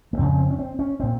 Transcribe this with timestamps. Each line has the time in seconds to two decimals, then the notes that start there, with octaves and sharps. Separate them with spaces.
0.13 A#3
0.18 F2 C#3 C4
0.38 C4
0.51 C#4
0.59 C4
0.79 C#4
1.00 A#2 C4